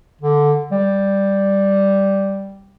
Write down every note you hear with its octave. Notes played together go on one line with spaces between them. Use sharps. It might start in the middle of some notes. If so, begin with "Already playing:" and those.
D3
G3